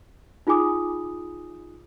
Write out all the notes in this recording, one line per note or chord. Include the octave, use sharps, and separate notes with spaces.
D#4 F4 G#4 G#5 D6 D#6